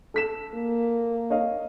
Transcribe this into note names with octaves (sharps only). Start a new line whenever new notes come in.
A4 B6 E7
A#3
C#5 D#5 F5